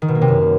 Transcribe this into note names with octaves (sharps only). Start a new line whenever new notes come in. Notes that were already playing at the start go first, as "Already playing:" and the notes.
D#3
B2
A#3
C3
F#2